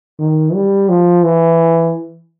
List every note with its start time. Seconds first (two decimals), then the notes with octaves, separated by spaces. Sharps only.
0.20 D#3
0.54 G3
0.89 F3
1.23 E3